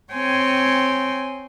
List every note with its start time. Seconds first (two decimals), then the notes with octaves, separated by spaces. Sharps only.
0.13 C4 C#5 G5 G#5 C6